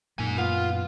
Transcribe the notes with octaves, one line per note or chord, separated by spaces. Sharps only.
F#2 A#2 A#3 D#4 G#5
B3 F4 F5